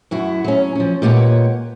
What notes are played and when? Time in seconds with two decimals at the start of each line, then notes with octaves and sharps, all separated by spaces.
0.11 F#2 E4 F#4
0.44 F#3 C#4
0.75 F3 C#4
1.02 A#2 G#3 G4 B4 C#5 F#5